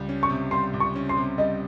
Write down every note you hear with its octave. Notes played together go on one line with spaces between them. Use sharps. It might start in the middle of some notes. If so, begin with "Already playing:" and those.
Already playing: C#2 G3
C#4
C#6
C3
G3 C6
C#2
C#6
C#4
C6
C3
G3 D#5